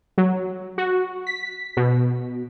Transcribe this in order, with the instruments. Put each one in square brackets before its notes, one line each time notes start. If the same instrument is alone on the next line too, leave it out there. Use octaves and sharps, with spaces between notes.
[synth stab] F#3
F#4
B6
B2